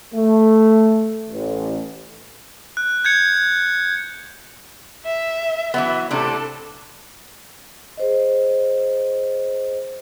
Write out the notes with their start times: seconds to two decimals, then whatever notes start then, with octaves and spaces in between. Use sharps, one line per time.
0.13 A3
1.30 A1
2.77 F#6
3.05 G6 G#6 C#7
5.05 E5
5.74 E3 F#3 B3 E5
6.11 A2 C3 D4 A4
7.97 G#4 C5 D#5